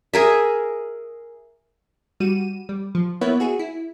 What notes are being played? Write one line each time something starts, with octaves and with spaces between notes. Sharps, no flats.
G#4 A#4 E5
G3 F#4 D#7 E7
G3
F3
A#3 B3 E4 B4 C#5 E5
F#4 G#4
E4